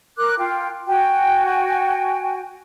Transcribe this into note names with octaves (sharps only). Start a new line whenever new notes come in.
A#4 D6 F#6
F4 G5
F#4 G5 G#5